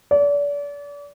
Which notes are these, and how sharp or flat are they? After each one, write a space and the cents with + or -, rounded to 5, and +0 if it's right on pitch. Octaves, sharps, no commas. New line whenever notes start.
D5 -35